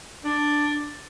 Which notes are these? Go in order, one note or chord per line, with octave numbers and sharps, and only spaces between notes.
D4